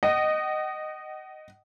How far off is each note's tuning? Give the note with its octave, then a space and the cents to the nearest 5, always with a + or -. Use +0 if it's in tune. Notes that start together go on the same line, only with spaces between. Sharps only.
D#5 -10 F#5 +40